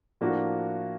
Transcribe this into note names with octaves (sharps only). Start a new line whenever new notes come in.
A2 F3 A#3 D4 F#4